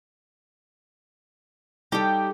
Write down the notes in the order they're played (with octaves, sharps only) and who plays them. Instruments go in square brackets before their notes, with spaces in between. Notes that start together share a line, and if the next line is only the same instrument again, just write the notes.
[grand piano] G3 D#4 A4 [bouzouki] G4 G5